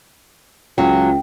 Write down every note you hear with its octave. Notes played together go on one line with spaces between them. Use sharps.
C#2 F#3 F4 G5